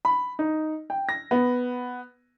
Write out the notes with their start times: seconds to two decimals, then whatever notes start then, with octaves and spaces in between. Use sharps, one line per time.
0.05 B5
0.39 D#4
0.90 G5
1.09 A#6
1.31 B3